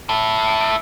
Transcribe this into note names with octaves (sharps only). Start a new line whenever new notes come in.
E4 A5